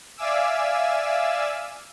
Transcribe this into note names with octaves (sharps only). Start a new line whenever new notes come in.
D5 E5 F5 G#5 D6 E6